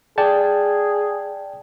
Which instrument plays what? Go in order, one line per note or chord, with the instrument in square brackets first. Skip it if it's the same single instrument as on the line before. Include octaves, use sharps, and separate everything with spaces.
[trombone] G#4 [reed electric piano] D5 G5 A5